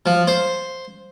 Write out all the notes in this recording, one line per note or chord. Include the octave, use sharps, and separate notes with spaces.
F3
C5